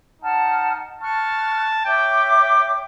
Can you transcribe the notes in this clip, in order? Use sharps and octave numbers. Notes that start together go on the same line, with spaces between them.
D#4 F#5 A5 F6
A5 C#6 F6 F#6
C#5 E5 G5 D6